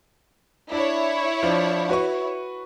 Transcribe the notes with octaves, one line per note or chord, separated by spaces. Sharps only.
D4 E4 C#5
F3 D4
F#4 B4 C#6